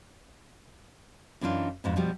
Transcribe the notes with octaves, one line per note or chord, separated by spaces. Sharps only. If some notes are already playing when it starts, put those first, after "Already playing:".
F#2 E3 D4 D#4 F4
F2 G#2 B2
B2 F3 G3